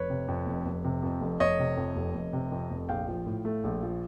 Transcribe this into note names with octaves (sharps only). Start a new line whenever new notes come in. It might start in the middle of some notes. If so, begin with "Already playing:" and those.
Already playing: F1 B4 C#5
C3
F2
F1
F1
C3
F2
F1
F1 C#5 D#5
C3
F2
F1
F1
C3
F2
F1
A#1 F5 G5
F3
A2
A3
A#1
F3